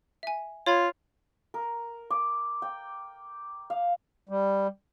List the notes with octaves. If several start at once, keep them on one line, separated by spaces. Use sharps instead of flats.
E5 G#5
F4 C#5 B5 G#6
A#4
D6
G5
F5
G3